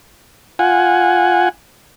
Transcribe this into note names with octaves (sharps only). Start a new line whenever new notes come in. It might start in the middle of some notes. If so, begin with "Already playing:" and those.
F4 F#5 G#5